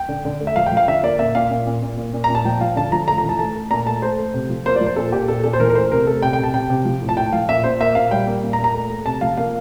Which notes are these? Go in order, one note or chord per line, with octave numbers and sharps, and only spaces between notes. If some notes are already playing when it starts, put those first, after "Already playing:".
Already playing: G5
D3
D3
A3
E5
F3 F5
G5
F3
F5
D3 E5
A#3 D5
A#2 E5
A#2 F5
A#2
A#2
A#2
A#2
A#2
A#5
A#2
A5
F3 G5
F3 F5
D3 A5
F3 A#5
A3 A#5
A#5
E3
A5
A3 A5
A3
A#2 A#5
A3 A5
A3 C5
A3
C3
F3
A#3 C5
D5
F3
C5
A#2 A4
A#2 G4
A#2 A4
A#2 A4
C5
E3 A#4
A#4
A3 C5
C3 A#4
A3 A4
C3 G5
G5
C3
A5
C3 G5
C3
F3
A2
A5
A2 G5
F3 F5
A#2 E5
A#2 C5
A#3 E5
A#2 F5
G3 G5
A#3
A#2
A#5
A#3
A#5
A3
A3
C3 A5
F3 F5
A#3 F5